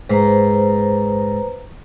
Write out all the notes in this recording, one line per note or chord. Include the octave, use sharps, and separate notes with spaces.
G#2 B4 C5 A#5